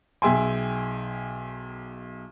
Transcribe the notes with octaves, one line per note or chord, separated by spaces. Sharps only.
B1 G#4 E5 G5 G#5 C6